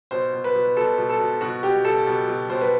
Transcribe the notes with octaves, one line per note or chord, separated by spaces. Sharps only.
B2 C5
B2
B4
B2
B2 A4
B2
A4
B2
B2 F#4
B2 G4
B2 A4
B2
B2
B2 C5
B4